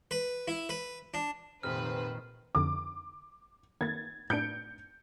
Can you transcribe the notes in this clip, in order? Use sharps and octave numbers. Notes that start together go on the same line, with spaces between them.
B4
E4
B4
D4
F1 A#2 D#3 B4 C5 F6
F2 D3 A#5 D6
D#3 A#3 G#6 A6
A2 D4 G6 C#7 D7